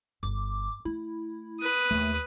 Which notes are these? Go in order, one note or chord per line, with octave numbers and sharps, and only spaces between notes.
G1 D6
A3 E4
B4 D#6
D#2 A3